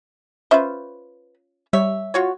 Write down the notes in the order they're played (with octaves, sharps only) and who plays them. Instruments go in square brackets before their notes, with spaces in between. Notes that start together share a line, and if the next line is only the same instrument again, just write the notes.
[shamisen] C#4 F4 E5 [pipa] B4 C5
[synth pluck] G3 [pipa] C#5 E5
[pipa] F4 F#4 C#5